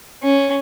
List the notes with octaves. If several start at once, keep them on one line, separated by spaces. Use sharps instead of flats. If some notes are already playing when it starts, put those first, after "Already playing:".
C#4